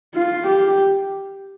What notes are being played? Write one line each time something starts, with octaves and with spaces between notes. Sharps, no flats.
F4
G4